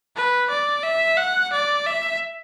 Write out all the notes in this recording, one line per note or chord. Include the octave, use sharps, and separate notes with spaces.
B4
D5
E5
F#5
D5
E5